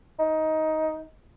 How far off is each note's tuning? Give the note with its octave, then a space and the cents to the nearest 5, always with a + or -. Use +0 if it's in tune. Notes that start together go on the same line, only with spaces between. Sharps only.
D#4 +15